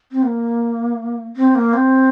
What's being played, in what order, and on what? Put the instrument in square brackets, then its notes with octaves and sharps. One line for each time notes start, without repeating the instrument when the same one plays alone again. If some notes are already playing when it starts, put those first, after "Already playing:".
[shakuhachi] C4
A#3
C4
A#3
C4